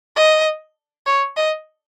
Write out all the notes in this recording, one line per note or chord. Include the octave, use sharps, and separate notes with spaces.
D#5
C#5
D#5